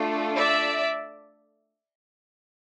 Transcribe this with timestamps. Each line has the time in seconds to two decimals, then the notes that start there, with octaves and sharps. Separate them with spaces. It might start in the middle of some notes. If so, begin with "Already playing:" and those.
Already playing: A3 D4 F4 A4
0.37 D5 E5